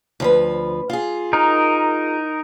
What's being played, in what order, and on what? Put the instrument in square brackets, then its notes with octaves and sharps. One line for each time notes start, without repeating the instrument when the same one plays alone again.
[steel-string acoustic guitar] D2 F3 B4
F4 G#4
[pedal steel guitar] D#4 A#4